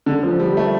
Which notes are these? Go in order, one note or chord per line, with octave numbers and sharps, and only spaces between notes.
D3
F3
G3
A3